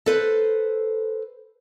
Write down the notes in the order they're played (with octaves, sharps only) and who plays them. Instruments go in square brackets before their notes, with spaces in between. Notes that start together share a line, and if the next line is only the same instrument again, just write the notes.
[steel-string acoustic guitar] A4 B4 C5